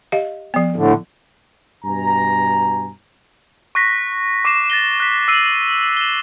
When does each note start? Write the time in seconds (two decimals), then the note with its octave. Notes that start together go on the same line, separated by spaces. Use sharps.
0.12 G4 D#5 F5
0.54 F3 B3
0.76 A2 D3
1.85 G2 B2 G#5 A#5
3.75 C#6 F#6 A#6 B6
4.45 C#6 D6 B6 C7 E7
4.70 A6 A#6 G7
5.00 F#6 B6
5.28 E6 C7 D#7 F#7
5.97 E7 G7